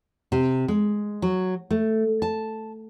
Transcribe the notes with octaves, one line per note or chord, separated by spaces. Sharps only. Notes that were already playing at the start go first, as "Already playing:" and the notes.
C3
G#3
F#3
A3
A5